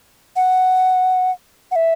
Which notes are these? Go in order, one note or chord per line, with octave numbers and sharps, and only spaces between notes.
F#5
F#5
E5